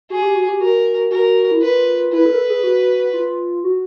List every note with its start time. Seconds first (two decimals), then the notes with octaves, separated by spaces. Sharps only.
0.10 F#4 G#4
0.22 G4
0.35 F#4
0.48 G4
0.60 F#4 A#4
1.11 F#4 A#4
1.51 E4
1.62 F4 B4
2.12 E4 B4
2.26 A4
2.33 A#4
2.38 A4
2.50 G#4
2.64 F#4
3.13 F4
3.64 F#4